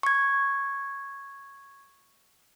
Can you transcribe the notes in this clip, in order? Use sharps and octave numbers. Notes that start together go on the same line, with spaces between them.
C#6 G#6